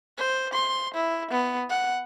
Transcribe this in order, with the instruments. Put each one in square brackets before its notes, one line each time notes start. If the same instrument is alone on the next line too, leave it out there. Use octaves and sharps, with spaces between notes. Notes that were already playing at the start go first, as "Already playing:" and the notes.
[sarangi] C5
C6
E4
B3
F#5